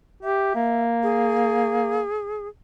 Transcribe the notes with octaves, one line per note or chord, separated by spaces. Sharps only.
G4 E5
A#3
G#4